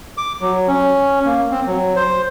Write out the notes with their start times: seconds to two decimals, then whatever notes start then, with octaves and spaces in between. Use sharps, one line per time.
0.17 D6
0.41 F#3
0.68 C#4
1.25 A#3
1.51 C4
1.67 F#3
1.96 C5